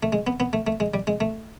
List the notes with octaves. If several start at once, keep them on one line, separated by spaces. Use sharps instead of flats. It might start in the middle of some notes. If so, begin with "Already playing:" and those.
A3
G#3
B3
B3
A3
A3
G#3
G3
G#3
A3